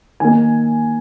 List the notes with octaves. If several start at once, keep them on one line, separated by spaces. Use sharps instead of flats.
D#3 A#3 G#5